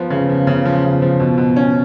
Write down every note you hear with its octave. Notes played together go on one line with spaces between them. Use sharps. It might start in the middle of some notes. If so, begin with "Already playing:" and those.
Already playing: F3 B3
C#3
F3
C#3
F3
C#3
F3
B2
B2
C#4